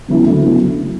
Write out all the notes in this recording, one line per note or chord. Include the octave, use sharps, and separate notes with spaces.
C#3 F#3 B3 E4
D2
C#3 F#3 B3 E4